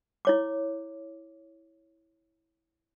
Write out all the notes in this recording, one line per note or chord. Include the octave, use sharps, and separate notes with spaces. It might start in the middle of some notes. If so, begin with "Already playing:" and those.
E4 C#5 D6